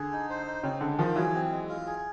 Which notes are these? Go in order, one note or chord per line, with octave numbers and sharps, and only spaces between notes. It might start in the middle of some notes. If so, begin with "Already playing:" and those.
Already playing: D3 G#4
D#4
C5
D#4
C#3 C4
D3 G#3
D#3 F3 F4
E3 F#3 G#4
C4
G#3
F4
G#4